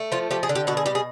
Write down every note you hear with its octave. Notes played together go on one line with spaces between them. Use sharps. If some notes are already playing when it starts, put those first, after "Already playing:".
Already playing: A3
F3 F4
F3 G4
G#4
D3
G4
B2 F#4
G#4
G3 G4
G#4